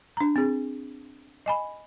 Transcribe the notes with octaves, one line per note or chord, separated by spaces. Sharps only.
D4 A#5
C4 G#4
D#5 G#5 B5